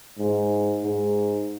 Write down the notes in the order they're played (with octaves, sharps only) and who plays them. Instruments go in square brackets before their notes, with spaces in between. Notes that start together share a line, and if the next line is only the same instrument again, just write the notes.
[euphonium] G#2
G#2